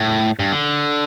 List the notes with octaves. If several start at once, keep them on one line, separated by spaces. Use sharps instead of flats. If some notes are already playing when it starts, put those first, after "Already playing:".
Already playing: A2
G2
D3